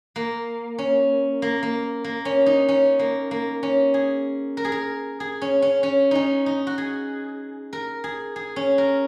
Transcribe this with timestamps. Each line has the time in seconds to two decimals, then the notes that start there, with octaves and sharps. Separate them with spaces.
0.16 A#3
0.78 C#4
1.42 A#3
1.63 A#3
2.04 A#3
2.25 C#4
2.46 D#4
2.69 C#4
2.99 A#3
3.31 A#3
3.63 C#4
3.94 G#4
4.57 A#4
4.65 G#4
4.72 A#4
5.20 G#4
5.42 C#4
5.62 C#4
5.83 C#4
6.11 C#4 D#4
6.46 D#4
6.67 F#4
6.78 G#4
7.73 A#4
8.04 G#4
8.36 G#4
8.56 C#4
8.78 A#4